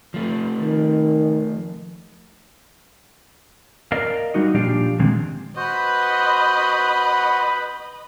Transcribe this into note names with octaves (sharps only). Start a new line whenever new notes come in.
F3 A3
D#3
A#4 D5 D#5 F5
G3 D#4 F#4 D#5
A#2 F3 D4 G4 D5 F5
A#2 D3 D#3 G#3 C4
F#4 B4 C5 D#5 B5